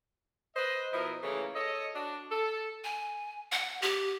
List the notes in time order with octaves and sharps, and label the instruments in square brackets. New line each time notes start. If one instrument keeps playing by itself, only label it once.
[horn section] B4 C5 D#5
B2 F3 E4 A#4 D#5
C#3 E3 A3 A#3 C#4
A4 C#5 D#5
D4 F#4
A4
[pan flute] G#5
F#5
G4